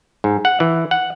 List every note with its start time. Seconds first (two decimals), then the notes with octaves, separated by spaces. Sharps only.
0.24 G#2
0.45 F#5
0.60 E3
0.91 F#5